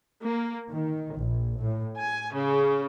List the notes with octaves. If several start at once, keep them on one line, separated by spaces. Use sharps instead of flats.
A#3
D#3
A#1
A2
G#5
C#3